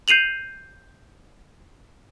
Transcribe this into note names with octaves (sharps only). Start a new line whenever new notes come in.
G6 C7 D#7 F7 F#7